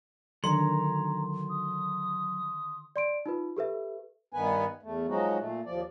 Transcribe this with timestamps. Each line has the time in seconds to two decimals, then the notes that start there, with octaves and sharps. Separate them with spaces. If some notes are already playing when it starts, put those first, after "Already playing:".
0.44 D3 D#3 F#3 A#5 C6
1.50 D#6
2.96 D5 C6 D7
3.26 D#4 F4 B4
3.57 G4 A4 B4 E5
4.33 G2 D#3 B3 B4 G#5
4.83 E2 A3
5.08 F3 F#3 G#3 D#4 F#4
5.39 A#2 A3
5.66 D#2 F3 D5